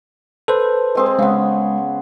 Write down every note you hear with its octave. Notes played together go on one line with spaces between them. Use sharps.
A4 B4 C5
G#3 C4 G#4
C#3 G#3 B3